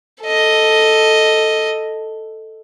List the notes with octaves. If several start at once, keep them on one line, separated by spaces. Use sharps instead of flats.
A4 D#5